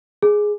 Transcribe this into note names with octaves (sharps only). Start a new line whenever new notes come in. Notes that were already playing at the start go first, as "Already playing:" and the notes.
G#4